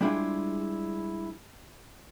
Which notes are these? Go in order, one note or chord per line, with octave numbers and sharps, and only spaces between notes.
G3 G#3 D4 E4 F4 G#4